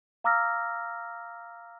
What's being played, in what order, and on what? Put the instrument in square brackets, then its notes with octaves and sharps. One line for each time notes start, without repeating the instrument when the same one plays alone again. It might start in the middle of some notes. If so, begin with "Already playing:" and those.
[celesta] F5 A#5 D6 E6 F6 A#6